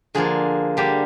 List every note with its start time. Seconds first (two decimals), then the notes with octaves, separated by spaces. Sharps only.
0.15 D3 F3 A#3 G#4
0.77 D3 G3 A#3 G4